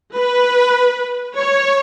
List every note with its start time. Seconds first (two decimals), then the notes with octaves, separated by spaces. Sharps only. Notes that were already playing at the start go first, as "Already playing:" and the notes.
0.16 B4
1.35 C#5